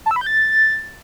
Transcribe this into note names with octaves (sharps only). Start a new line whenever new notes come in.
A5
E6
B5
G6
A6